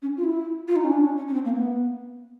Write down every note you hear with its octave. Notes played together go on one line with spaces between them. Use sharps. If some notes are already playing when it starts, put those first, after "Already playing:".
C#4
F4
E4
F4
D#4
C#4
D4
C#4
C#4
C#4
C4
A#3
B3